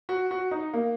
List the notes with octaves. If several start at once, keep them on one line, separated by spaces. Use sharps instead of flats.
F#4
F#4
D#4
A#3